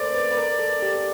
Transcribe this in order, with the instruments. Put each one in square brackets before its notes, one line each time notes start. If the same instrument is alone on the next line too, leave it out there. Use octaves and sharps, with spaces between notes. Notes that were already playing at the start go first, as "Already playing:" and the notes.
Already playing: [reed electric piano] A4 A#4 C5 [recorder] D5
[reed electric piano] B4
B4
A#4
A4
G4